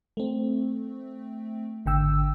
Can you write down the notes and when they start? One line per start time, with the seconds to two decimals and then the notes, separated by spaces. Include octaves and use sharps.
0.17 A3 C4
1.86 G#1 D3 G5 E6